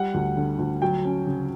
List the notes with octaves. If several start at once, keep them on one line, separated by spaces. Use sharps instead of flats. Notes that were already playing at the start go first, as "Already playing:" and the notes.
Already playing: G3 F#5
D2
D3
D2
F#3 G5
C#4
C#3